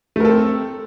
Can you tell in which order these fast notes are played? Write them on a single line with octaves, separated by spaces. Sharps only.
A3 A#4 A4 C4